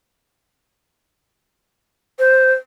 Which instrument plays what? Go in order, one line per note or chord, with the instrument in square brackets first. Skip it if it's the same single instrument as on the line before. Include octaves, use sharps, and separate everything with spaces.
[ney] C5